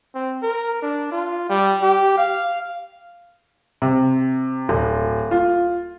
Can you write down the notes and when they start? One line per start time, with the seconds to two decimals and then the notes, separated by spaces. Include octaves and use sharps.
0.14 C4
0.43 A#4
0.82 D4
1.12 F4
1.49 G3
1.82 G4
2.18 F5
3.82 C3
4.69 D1
5.31 F4